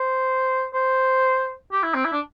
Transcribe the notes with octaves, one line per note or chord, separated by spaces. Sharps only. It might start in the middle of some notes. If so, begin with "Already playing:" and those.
Already playing: C5
C5
G4
E4
C4
E4
D4